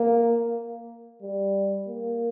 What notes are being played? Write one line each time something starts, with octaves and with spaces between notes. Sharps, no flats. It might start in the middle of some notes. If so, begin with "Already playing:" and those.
Already playing: A#3
G3
A#3